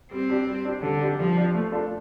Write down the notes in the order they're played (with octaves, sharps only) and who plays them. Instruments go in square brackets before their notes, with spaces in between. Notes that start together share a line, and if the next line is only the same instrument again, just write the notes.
[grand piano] G3 [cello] C4
[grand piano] D4 G4
G3
D4 G4
[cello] D3 [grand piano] G3
[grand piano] D4 G4
[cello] F3 [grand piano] G3
[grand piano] D4 G4
A3
D4 F4 A4